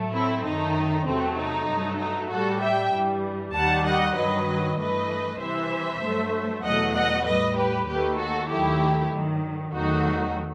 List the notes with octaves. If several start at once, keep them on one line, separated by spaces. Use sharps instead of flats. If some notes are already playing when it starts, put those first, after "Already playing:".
Already playing: A2 F#3 A3
C4 E4
F#2 D#3 A3 D#4
E2 C3 F#3 A3 C4
D#4
G2 F#3 A3
D#4
A2 G3 F#4 A4
E5 G5
G2 E3 G3
D#2 D#3 G3 F#5 A5
D#5 F#5
G2 D#3 F#3 B4 D#5
G2 E3 A3 B4 D#5
C2 C3 E3 C5 E5
G2 F#3 A3
E2 B2 F#3 A3 D#5 F#5
D#5 F#5
A2 G3 B4 D#5
G4 B4
D#2 D#3 A3 G4 B4
F#4 A4
D#2 D#3 F#3 A3 E4 G4
G2 D#3 F#3
E2 D#3 F#3 A3 D#4 F#4